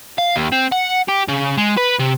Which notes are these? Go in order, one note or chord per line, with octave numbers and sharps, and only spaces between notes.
F5
D#2
C4
F#5
G4
C#3
G#3
B4
C3